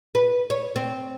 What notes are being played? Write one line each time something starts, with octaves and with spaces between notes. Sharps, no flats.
B4
C#5
C4